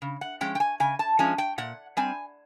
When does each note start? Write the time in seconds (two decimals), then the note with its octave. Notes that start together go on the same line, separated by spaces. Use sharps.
0.02 C#3
0.21 F#5
0.41 F3 G#3 C#4 G5
0.55 G5
0.60 G#5
0.80 C#3 G#5
0.99 A5
1.19 F3 G#3 C#4 G#5
1.38 G5
1.58 A#2 F#5
1.97 G3 C4 G#5